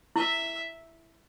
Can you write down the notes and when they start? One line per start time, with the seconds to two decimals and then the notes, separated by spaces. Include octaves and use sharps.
0.16 E4 E5